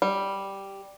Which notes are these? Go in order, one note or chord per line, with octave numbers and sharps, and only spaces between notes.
G3